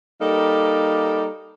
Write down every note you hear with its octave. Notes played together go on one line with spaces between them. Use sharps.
G3 A#3 D#4 A4